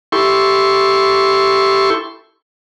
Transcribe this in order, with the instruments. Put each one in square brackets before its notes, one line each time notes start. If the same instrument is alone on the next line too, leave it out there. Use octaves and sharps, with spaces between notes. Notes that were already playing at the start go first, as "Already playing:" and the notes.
[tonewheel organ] E4 G4 A4 C6 C#6